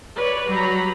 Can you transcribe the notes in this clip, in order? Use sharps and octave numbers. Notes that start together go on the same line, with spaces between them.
B4 C#5 D5
F#3 G3 A#5 B5